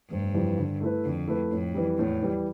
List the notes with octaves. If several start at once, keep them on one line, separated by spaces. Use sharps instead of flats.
F1 G2
F2 E3 G3
D3
A3 E4 B4
F2 D3
A3 E4 B4
F2 A2
E3 G3
E2 A2
E3 G3